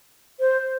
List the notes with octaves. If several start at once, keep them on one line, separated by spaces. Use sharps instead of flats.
C5